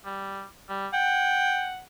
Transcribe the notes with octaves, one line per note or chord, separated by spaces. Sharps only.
G3
G3
F#5 G5